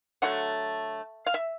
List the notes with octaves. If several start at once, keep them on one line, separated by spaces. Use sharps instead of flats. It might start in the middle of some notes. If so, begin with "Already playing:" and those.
D3 F#3 A3 F#5
F5
E5